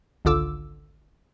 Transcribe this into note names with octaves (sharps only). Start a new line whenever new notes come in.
G#1 C#2 D3 F4 D6 E6